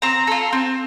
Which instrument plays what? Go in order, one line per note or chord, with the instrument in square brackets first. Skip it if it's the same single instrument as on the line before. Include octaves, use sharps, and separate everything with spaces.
[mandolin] C4 A#5
F4 A4
C4